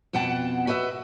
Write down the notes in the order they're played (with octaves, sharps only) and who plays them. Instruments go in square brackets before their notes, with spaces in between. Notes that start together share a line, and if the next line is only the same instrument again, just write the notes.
[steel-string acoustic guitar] F2 B2 F#5 G5 A5
F#4 B4 D#5 E5